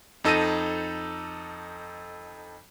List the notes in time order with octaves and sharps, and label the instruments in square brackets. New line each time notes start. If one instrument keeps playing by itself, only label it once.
[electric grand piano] F2 D#4 A4 E6 A#6 D#7